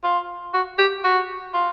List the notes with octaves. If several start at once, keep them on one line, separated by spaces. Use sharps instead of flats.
F4
F#4
G4
F#4
F4